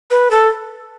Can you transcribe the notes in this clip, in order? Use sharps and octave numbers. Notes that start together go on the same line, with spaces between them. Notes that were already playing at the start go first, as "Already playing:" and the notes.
B4
A4